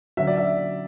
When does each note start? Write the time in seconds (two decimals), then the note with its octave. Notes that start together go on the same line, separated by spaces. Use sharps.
0.17 D3 F#3 C#4 F#4 E5
0.27 D5
0.37 E5